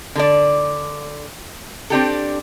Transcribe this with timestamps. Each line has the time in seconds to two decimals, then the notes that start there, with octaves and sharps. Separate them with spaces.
0.15 D3 A4 D5
1.90 C4 D4 G4 A4